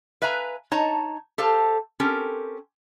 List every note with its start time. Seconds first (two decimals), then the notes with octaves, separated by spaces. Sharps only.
0.22 B4 E5 F5 G#5 A#5
0.71 D#4 C#5 D#5 A5 A#5
1.38 G4 A4 C5 F5
2.00 C4 C#4 G4 A4 A#4